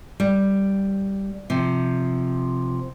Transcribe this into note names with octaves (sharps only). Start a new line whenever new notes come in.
G3
C3 F3